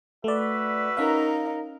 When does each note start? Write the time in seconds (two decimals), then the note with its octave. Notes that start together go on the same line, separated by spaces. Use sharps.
0.24 A3 F#4 B4 D5 E5
0.97 C#4 D#4 A#4 F5